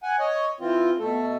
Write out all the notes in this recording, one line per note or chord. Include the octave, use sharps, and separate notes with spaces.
F#5 G#5
C#5 D#5
E3 C4 F4
B2 A3 A4